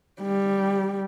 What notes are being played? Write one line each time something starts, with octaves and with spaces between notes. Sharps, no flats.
G3